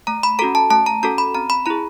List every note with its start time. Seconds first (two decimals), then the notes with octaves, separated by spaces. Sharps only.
0.07 A3 A#5
0.23 B5
0.39 C#4 F#4 A4 A#5
0.55 A5
0.70 A3 A5
0.86 A#5
1.03 C#4 F#4 A4 A#5
1.18 B5
1.35 C4 A#5
1.50 B5
1.66 E4 G#4 A#5